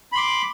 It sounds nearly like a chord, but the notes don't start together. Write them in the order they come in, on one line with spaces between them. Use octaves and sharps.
B5 C6 D6